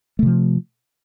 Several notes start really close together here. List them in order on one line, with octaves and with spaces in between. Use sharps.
A3 C3 F3